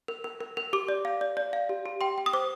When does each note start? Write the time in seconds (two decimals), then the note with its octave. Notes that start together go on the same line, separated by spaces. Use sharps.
0.08 A#4
0.24 A#4
0.41 A#4
0.57 A#4
0.73 G4 D6
0.88 D5
1.05 F5
1.21 D5
1.37 D5
1.53 F5
1.69 G4
1.86 G4
2.01 G5 C6
2.18 G5
2.26 D#6
2.33 C5 D6